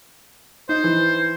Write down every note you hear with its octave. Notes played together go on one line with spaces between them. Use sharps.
D#4 C5
E3